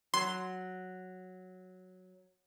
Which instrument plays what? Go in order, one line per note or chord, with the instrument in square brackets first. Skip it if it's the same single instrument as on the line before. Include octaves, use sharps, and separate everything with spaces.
[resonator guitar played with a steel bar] F#3 [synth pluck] C6